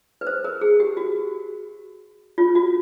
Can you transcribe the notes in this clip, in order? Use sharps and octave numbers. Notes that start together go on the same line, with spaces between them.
B4
C5
A#4
G#4
G4
F#4
F4
F#4